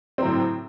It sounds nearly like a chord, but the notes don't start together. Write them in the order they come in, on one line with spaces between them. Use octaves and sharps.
C4 F#3 A2